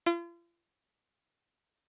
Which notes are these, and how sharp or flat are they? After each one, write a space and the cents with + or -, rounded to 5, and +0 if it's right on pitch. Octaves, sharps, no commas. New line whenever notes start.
F4 -40